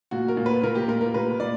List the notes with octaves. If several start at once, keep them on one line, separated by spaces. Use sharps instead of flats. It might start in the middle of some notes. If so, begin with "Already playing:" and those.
A#2 F#4
A#4
A#2
B4
A#2 A#4
G4
A#2 A#4
A#4
A#2 B4
A#2 D5